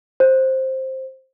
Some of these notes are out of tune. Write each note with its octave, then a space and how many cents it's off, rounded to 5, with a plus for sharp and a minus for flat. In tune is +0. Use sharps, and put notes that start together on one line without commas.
C5 +10